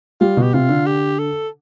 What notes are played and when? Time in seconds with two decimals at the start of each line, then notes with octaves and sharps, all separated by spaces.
0.21 G3 F4
0.37 B2 G4
0.54 C3 F4
0.69 D3
0.86 G4
1.19 A4